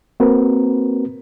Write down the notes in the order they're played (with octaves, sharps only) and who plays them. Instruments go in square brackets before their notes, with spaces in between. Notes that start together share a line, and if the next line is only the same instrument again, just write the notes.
[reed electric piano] A#3 C4 F#4 A#4 B4